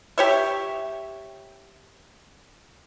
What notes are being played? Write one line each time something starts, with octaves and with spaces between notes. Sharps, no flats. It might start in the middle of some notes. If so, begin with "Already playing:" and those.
G4 C#5 E5